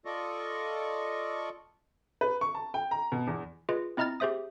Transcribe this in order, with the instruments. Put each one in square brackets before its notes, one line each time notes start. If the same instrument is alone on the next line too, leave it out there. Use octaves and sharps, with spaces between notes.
[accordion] F4 A4 D5 D#5 C#6
[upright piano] B4
C#6
A5
G5
A#5
B2
E2
[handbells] F4 G#4 B4 D#5
C4 E4 D#5 A#5 F6 A6
G4 G#4 C5 E5 D#6